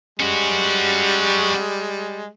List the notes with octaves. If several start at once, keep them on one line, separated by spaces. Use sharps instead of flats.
G3 G#3 C#4 F#4